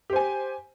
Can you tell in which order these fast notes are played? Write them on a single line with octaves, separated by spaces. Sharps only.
G4 C5 G#5